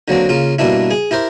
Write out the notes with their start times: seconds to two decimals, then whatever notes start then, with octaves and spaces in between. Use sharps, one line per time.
0.08 D3 F#3 A#3 C4
0.29 C#3 A#3 F4
0.59 G2 B2 A#3 D4 E4
0.91 G#4
1.11 E4 G4 A#4 C5